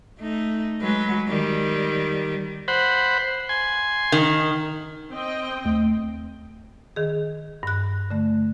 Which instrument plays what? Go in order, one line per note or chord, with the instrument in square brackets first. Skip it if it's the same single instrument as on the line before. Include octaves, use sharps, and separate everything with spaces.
[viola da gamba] A3 D#4
F#3 G#3 B4
D#3 G3
[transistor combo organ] C5 F#5 B5
G#5 C6
[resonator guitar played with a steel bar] D#3
[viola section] C4 D#5 G5
[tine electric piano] D#2 A3
[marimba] D#3 G#4
G2 F#6
D3 A3